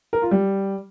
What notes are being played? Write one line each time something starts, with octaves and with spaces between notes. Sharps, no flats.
A#4
F4
G3